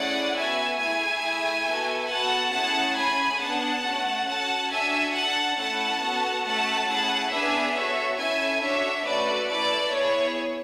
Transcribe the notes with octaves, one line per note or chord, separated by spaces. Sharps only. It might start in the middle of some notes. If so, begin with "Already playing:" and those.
Already playing: A3 C#4 E4 G#4 D5 F#5
B3 F#4 A4 E5 G#5
A3 E4 G#4 E5 G#5
A3 E4 G#4
B3 F#4 A4
B3 F#4 A4 F#5 A5
A3 C#4 E4 G#4 F#5 A5
A3 C#4 G#4 G#5 B5
B3 D4 G#4 F#5 A5
A3 C#4 F#4
C#4 F#4 A4 F#5 A5
D4 F#4 A4 E5 G#5
D4 A4 F#5 A5
A3 C#4 E4 A4 F#5 A5
B3 F#4 A4
A3 C#4 F#4 A4 F#5 A5
A3 C#4 E4 G#4 F#5 A5
B3 D4 G#4 E5 G#5
B3 F#4 A4 C#5 E5
C#4 E4 A4 E5 G#5
D4 F#4 A4 C#5 E5
A3 C#4 F#4 A4 B4 D5
A3 E4 A4 B4 D5
B3 E4 G#4 C#5